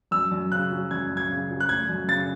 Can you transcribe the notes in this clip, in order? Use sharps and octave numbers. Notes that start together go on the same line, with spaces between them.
F#2 E6
F#2
C#3 F#6
F#3
F#2 G#6
F#2
G#6
C#3
F#3
F#6
A3 G#6
F#2
C#3 A6